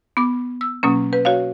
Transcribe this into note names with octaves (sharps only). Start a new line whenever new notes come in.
B3 D6
E6
B2 F#3 A#3 C#4
B4
F#4 C#5 F5